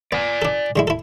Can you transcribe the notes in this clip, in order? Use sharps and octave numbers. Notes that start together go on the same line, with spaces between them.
B3 D5 G#5
D4 A4
D3 G#3 E4
E4 A4